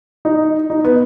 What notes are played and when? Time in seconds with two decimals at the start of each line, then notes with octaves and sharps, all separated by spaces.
0.25 D#4
0.70 D#4
0.85 B3